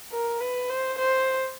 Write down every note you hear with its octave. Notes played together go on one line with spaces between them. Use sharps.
A#4
B4
C5
C5